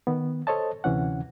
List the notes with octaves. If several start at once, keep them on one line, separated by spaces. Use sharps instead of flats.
D#3 B3
A4 C5 C#5 D#5 A5
D2 C3 E3 C#4 F#5